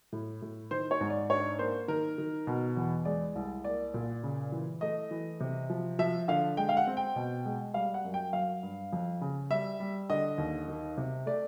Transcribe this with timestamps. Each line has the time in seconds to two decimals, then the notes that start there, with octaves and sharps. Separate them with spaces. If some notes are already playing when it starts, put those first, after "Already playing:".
0.12 A2
0.42 A2
0.71 D#3 C5
0.91 C#5
1.01 G#2
1.10 D5
1.30 D4 C#5
1.59 A#3 C5
1.88 D#3 A#4
2.18 D#3
2.47 B2
2.77 E2
3.05 G#3 D5
3.35 C2
3.64 A#3 D5
3.94 A#2
4.23 C#3
4.52 E3
4.81 A3 D#5
5.11 E3
5.40 C3
5.70 F3
5.99 F3 E5
6.28 D3 F5
6.57 G#3 G5
6.69 F5
6.77 F#5
6.87 C4
6.97 G5
7.16 B2
7.45 G#3
7.74 G3 F5
7.94 F#5
8.04 F#2
8.14 G5
8.33 F#3 F5
8.63 G2
8.93 F2
9.21 C#3
9.50 G3 E5
9.80 G3
10.10 D3 D#5
10.38 D#2
10.68 D#3
10.97 C3
11.26 A3 D5